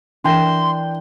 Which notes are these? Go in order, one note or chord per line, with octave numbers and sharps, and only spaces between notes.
E3 D4 A#4 G5 C6 E7